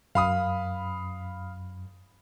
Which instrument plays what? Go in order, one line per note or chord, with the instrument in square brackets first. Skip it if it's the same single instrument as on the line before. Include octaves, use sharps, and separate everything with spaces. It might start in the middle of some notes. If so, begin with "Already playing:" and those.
[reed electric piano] F#2 [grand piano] F5 B5 D#6